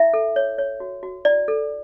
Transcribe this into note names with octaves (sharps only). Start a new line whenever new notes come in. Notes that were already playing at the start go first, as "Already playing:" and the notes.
Already playing: E4 E5
A4
C#5
C#5
F#4
F#4
E4 D5
A4